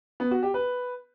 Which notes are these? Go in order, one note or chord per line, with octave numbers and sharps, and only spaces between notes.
B3
F#4
G4
B4